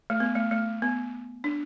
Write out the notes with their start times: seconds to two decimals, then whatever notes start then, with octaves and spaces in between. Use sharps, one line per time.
0.10 A3
0.20 B3
0.35 A3
0.51 A3
0.82 B3
1.44 D4